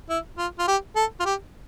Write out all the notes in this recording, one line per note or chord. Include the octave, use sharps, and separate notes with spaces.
E4
F4
F4
G4
A4
F4
G4